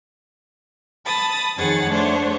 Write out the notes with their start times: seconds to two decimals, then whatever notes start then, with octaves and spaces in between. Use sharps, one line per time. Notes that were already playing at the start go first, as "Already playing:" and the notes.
1.04 A5 B5 D#6 A6
1.57 F2 D#3 G#4 C#5 F#5 A6
1.90 A3 D4 C5 C#5 F#5